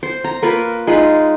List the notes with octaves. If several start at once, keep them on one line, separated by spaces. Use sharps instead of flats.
C5
A#5
A#3 F4 A#4 B4
G#3 D#4 F4 B4